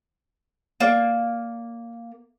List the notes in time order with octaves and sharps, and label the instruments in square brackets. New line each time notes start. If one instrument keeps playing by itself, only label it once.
[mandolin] A#3 [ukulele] D5 F5